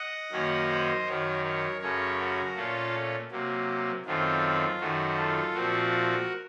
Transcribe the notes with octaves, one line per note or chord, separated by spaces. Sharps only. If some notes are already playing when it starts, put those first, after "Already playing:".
Already playing: D#5 F#5
F#2 D#3 F#3 A#3 C#4
C5 D#5
F#2 D#3 F#3 A#4 C#5
A#4 C#5
F#2 C#3 A3 C#4 A#4 C#5
F#4 A#4
A#2 A3 C#4 F4 A4
C3 F#3 A#3
F#2 D#3 A3 C4 F4
F#2 D#3 A3 F#4
F4 A4
A#2 F3 A3 C4 F#4 A#4